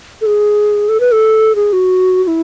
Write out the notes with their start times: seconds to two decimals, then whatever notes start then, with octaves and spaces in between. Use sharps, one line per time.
0.21 A4
0.26 G#4
0.89 A4
1.00 B4
1.12 A4
1.55 G#4
1.73 F#4
2.24 F#4
2.27 E4